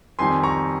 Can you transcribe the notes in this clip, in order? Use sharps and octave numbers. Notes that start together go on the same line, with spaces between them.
F2 D#3 G3 G#5 C6
A#5 C#6